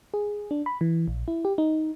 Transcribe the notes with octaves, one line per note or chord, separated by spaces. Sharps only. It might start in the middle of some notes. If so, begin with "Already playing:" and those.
G#4
D4
B5
E3
A#1
E4
G4
D#4